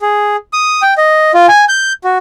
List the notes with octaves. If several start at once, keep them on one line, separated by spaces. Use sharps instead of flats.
G#4
D#6
G5
D#5
F4
G#5
G6
F#4